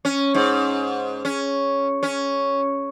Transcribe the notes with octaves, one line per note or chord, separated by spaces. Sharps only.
C#4
G#2
C#4
C#4